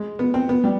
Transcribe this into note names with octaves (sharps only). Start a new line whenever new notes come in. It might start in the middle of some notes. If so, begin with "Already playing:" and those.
Already playing: G#3
B3
C4
B3
G3